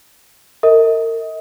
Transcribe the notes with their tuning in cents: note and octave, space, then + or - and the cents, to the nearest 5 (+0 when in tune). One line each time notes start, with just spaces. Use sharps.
A#4 -35 D#5 +40